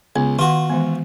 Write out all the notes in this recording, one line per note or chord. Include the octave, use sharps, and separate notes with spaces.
C#2 B3
D#3 F4 F#4
E3 G#3 B3